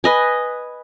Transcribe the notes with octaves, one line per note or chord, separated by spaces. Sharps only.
B4 D#5 G#5